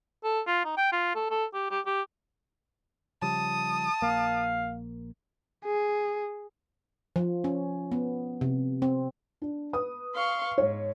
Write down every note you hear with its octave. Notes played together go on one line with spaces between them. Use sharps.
A4
F4
D#4
G5
F4
A4
A4
G4
G4
G4
C#3 F3 G3 A5 D#6
A#1 A#3 F5
G#4
F3
C#4
B3
C3
C4
D4
B4 D#6
F5 C6 C#6
G#2 C#5